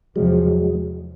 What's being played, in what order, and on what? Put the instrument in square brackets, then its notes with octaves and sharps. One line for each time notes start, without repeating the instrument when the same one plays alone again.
[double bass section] E2 C3 F3 [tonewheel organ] F#3 G#3